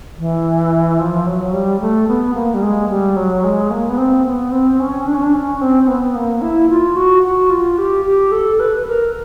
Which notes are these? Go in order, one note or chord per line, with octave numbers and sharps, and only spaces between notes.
E3
F3
F#3
G3
A3
B3
A#3
G3
G#3
G3
F#3
G#3
A#3
B3
C4
B3
C4
C#4
D4
C#4
D4
C#4
C4
B3
A#3
E4
F4
F#4
F#4
F4
G4
G4
A4
B4
A#4